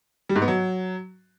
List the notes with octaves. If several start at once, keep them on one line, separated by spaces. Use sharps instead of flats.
G3
G#2
B3
F#3